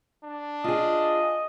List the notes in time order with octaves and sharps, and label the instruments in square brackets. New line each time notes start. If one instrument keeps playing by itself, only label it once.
[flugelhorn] D4
[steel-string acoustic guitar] F4 G#4 [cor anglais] D#5